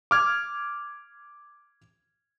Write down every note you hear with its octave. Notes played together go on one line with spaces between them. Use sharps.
D6 F6 G#6